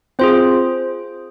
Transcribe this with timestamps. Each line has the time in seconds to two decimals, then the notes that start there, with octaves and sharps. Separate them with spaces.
0.19 C4 F4 G#4 C5